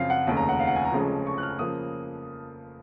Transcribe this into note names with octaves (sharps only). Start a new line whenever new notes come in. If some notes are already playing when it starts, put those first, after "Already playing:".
Already playing: F#2 C#3 F3 C4 F5
F#5
F1 D#2 C#3
A#5
F#5
F5
F#5
G#5
A#5
F1 F2 C#3 G#3 C#4
C#6
F#6
F6
C#3 F3 A#3 D#6